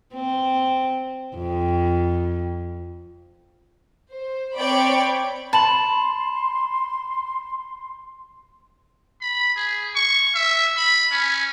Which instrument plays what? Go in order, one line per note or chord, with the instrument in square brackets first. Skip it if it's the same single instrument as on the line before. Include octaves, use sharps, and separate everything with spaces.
[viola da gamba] C4
F2
[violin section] C5
C4 C#5 D5 G5 B5 D7
[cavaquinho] A5 [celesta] B5 E7 F#7 [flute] C6
[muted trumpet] B5
G#4
C#6
E5
B5
C#4